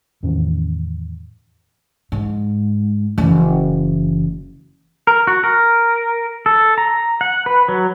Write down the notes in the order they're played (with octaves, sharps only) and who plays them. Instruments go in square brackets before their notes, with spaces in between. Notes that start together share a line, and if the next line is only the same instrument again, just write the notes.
[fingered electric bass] E2 A2 D#3 C#4
[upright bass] G#2
F#1 E3
[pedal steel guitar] A#4
F#4
A#4
A4
A#5
F#5
B4
F#3